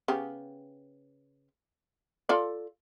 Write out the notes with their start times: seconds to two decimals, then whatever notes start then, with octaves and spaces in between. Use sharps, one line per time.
0.08 C#3 B3 G4
2.29 F4 A4 D5